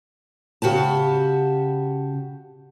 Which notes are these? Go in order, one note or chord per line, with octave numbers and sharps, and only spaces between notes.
C#3 F#4 G4 A5